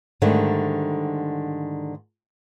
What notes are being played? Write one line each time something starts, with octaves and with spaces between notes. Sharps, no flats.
G#2 D3 D#3 G3 A3 D4